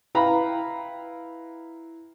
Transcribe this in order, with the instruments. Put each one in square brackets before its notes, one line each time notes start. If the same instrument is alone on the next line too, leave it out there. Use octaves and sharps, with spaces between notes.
[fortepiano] E4 B4 F5 G5 A#5 B5